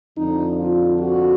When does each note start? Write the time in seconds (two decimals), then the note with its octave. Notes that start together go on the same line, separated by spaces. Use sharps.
0.17 F2 D3 F3 D#4
0.58 F4
1.00 F#4